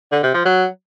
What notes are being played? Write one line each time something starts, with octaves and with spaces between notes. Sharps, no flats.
D3
C3
F3
F#3